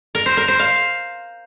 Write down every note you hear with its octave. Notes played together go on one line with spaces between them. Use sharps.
A#4
C5
A#4
C5
F5